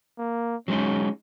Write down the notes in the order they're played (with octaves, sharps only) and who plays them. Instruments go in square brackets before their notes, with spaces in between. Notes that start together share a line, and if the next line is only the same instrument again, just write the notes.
[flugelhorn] A#3
[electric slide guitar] F#3 G#3 D#4 [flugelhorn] C#4